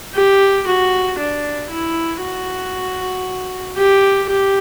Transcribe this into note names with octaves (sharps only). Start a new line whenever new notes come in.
G4
F#4
D4
E4
F#4
G4
G4